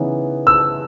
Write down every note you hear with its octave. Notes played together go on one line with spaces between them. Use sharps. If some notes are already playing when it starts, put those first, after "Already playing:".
Already playing: C#3 E3 B3 D#4
E6